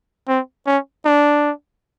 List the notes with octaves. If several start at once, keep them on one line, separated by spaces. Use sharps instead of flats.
C4
C#4
D4